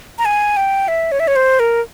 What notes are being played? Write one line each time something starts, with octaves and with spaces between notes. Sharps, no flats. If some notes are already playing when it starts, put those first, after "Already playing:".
A#5
G#5
G5
E5
C#5
E5
C#5
C5
A#4